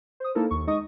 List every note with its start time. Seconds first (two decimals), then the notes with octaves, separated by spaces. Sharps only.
0.20 C5 D#6
0.35 A#3 D#4 E4 A4 A#4
0.51 D#2 C#6
0.67 G#3 D#4 D#5 C#6 D#6